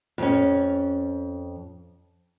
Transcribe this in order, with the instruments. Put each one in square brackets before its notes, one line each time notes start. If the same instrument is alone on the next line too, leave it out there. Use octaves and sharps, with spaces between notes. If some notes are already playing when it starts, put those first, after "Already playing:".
[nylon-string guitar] F2 C#4